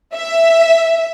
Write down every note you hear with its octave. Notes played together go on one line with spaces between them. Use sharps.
E5